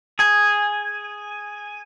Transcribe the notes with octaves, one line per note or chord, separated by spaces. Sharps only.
G#4 G#5